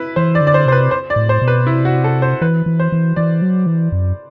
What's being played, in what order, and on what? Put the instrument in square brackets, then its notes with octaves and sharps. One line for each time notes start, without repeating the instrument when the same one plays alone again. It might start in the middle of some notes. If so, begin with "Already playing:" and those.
Already playing: [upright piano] E4 B4
[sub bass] E3 [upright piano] C5
[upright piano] D5
[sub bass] D3
[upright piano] D5
C5
[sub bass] C3 [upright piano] C5
[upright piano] B4
C5
D5
[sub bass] A2
[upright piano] C5
[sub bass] B2
[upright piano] B4
[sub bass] C3 [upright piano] E4
[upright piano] F#4
A4
C5
[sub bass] E3 [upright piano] B4
[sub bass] E3
[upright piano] C5
[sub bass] E3
[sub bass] E3 [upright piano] D5
[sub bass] F#3
E3
F#2